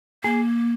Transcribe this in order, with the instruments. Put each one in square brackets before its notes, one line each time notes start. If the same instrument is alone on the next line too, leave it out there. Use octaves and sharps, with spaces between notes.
[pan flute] A#3 [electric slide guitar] G#4